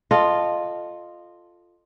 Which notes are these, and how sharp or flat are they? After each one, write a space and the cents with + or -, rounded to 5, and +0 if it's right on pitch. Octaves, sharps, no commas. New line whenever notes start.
F4 +0 A4 +0 D#5 -20